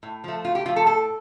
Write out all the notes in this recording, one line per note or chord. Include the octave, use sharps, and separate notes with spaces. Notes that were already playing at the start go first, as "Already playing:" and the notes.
A2
F3 A3
A2 F4
G4
F3 A3 F4
A4
A2 A4